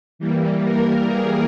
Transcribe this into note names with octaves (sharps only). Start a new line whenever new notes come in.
E3 G3 A#3
A#4
G#4